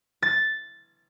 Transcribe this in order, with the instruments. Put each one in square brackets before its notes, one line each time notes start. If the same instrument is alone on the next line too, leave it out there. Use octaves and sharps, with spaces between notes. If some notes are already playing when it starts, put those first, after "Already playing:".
[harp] A6